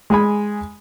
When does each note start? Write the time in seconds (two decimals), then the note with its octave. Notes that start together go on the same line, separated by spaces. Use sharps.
0.10 G#3 G#4 G#5 B5